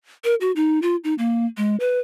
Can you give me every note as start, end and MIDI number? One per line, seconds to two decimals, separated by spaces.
0.25 0.35 70
0.41 0.52 66
0.56 0.81 63
0.82 0.96 65
1.04 1.14 63
1.18 1.46 58
1.57 1.76 56
1.80 1.99 71